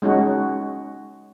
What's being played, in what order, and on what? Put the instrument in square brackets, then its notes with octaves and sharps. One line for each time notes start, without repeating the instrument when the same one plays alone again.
[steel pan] G#3 C#4 D#4 F#4